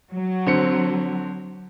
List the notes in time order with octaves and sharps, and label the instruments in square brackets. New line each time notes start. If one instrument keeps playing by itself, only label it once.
[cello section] F#3
[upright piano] D3 C4 C#7